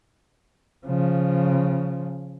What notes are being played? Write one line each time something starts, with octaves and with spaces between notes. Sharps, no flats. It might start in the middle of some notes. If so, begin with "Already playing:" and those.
C#3 F3